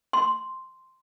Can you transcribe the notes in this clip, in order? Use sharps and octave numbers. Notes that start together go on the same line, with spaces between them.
C6